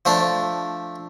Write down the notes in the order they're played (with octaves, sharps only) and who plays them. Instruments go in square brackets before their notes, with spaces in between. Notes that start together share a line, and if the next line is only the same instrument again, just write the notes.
[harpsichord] F3 A3 D4